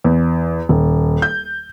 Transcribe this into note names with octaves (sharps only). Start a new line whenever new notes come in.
E2
D#1
G6